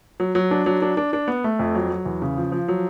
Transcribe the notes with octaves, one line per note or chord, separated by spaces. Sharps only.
F#3
F#3
D4
F#3
D4
D4
D4
B3
A3
F2
F#3
F#3
E2
C#3
F3
F3
F#3